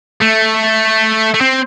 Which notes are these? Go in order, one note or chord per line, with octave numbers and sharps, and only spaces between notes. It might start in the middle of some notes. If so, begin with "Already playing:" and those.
A3
A3
C4